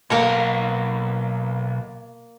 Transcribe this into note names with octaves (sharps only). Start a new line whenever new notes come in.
B1 A#3 A#4 C#5